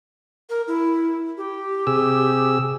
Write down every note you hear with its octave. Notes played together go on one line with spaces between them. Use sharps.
A#4
E4
G4
C3 G#4 E6